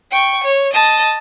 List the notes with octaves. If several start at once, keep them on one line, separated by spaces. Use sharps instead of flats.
G5 C#6
C#5
D#5 A5